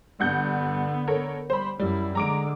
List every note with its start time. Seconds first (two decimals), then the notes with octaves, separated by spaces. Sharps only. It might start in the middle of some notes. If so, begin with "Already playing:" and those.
0.20 G2 D3 B3 F#5 G6
1.08 A4 A#4 C#5
1.50 G3 C5 B5
1.80 F#2 G3 E4
2.15 D3 G#3 A#5 D6 D7